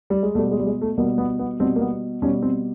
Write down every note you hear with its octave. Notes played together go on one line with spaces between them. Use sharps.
G3
G#3
B2 G3 A3
G#3
G3
G#3
A3
B2 G3 A#3
B3
B3
B2 G3 C4
A#3
B3
B2 G3 C#4
C4